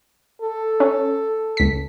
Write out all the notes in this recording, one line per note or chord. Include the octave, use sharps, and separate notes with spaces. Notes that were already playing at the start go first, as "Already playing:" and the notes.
A4
C#4
C#2 B6